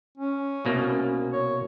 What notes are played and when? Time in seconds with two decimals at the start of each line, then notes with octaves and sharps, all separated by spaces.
0.18 C#4
0.65 C2 B2 A#3
1.33 C#5